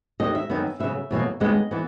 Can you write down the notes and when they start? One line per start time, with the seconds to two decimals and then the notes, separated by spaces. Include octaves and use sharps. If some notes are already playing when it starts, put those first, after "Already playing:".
0.20 D#2 D#3 F#3 D#5
0.35 E5
0.50 F#2 D#3 F#3 B3
0.80 C#3 F#3 B3 E5
1.11 E2 B2 F#3 A#3
1.40 D#2 C#3 G#3 B3 D#5
1.71 E3 B3